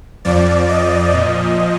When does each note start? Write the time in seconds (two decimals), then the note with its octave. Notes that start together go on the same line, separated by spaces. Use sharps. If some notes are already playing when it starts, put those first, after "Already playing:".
0.25 F2 F3 D5
0.69 D#5
1.14 A#2 F3